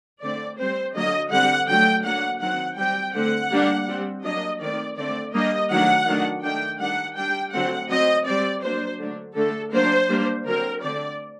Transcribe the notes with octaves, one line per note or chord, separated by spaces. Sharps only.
D3 A3 C4 D5
G3 C4 C5
D3 F#3 A#3 D#5
D3 G3 C4 F#5
D3 F#3 A3 G5
F#3 A#3 D4 F#5
D#3 F#3 C4 F#5
G3 C4 G5
D3 A3 C4 F#5
G3 A#3 D4
G3 C4
F#3 A#3 D4 D#5
D#3 A3 C4 D5
D3 A3 C4 D5
G3 A#3 D4 D#5
D#3 F#3 A3 D4 F#5
D#3 F#3 A3 D4
D#3 A3 D4 G5
D#3 G3 D4 F#5
G3 D4 G5
D3 F#3 A3 C4 F#5
F#3 C4 D#5
G3 C4 D5
F#3 A#3 D4 C5
D3 F#3 A3 D4
D3 A3 D4 A4
F#3 A#3 D4 C5
G3 A#3 D4
D3 F#3 C4 A#4
D3 A3 C4 D5